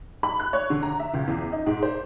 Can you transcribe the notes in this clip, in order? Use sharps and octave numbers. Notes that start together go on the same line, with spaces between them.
B5
F#6
C#5
D3
A#5
E5
C#2
E2
D#4
G#2
C5